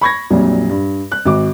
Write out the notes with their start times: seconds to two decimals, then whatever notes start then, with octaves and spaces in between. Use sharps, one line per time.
0.01 B5 C#6 G#6 A#6
0.30 A#1 F2 A#2 F#3 G3
0.69 G2
1.12 F#6
1.25 G#1 F#4 D6